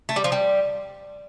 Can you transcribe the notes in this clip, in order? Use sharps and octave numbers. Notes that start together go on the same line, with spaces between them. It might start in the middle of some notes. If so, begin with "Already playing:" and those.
A3
G3
F3
G3